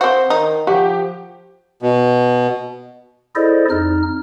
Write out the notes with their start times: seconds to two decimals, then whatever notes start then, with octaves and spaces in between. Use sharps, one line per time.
0.01 C4 F#4 C5
0.30 D#3 D#4
0.67 F3 F#4 G4
1.82 B2
3.35 E4 G#4 A4 C5 D5 D#5
3.70 F2 D#4 F6